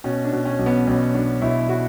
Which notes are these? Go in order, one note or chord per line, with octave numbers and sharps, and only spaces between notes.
B2 C#4
D4
B2
C#4
B1
B3
B1 C#4
B1 D4
B1 E4
F#4